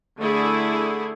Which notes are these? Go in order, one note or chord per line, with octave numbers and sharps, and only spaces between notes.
D3 A3 E4 G#4